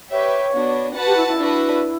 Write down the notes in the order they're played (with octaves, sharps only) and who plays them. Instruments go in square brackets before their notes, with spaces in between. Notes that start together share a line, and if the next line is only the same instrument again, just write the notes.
[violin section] G4 B4 E5 [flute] C#5
[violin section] B3 D4 F#4
F#4 B4 F#5 A5
[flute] G4
E4
E4
[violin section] D4 F#4 B4